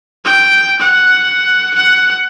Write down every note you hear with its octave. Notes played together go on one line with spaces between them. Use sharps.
G5
F#5
F#5